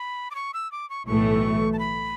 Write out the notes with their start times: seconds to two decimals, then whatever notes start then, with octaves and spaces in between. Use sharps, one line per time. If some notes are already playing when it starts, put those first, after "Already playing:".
Already playing: B5
0.31 D6
0.35 C#6
0.54 E6
0.72 D6
0.90 C#6
1.07 B1 A2 E3 A3 C#6
1.73 A5
1.79 B5